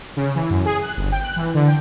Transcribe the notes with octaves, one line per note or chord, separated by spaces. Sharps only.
C#3
E3
F#2
G#4
F#6
G1
G5
F#6
E3
D3
G5